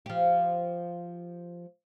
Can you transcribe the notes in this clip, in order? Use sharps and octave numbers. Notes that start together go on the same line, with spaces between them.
F3 G4